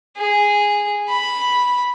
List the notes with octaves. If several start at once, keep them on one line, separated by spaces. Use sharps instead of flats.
G#4
B5